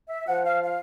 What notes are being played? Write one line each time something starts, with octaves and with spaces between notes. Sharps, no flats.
E5
F3 F#5
F5
F5